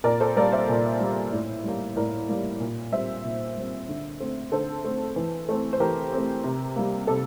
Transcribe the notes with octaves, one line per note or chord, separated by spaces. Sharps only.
A#2 A#4 D5
A4 C5
G3 A#3 A#4 D5
C5 E5
A#2
G3 A#3
A2
G3 A#3
A2 A#4 D5
G3 A#3
A#2
G3 C4 C5 E5
A#2
G3 C4
D3
A3 C4
D3 A4 C5
A3 C4
E3
A3 C4
C5
E3 G4 A#4
A3 C4
C3
G3 A#3
C3 A4